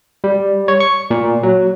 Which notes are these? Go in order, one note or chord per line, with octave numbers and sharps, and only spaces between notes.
G3
C#5
C#6
A#2
F#3